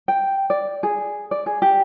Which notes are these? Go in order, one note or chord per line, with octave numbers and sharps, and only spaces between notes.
G5
D5
G#4
D5
G#4
G4